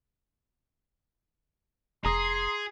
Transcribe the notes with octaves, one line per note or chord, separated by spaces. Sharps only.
F1 G#4 A#5 C6 D#6